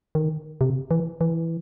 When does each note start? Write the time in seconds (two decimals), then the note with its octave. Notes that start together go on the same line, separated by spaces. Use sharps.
0.15 D#3
0.61 C3
0.91 E3
1.21 E3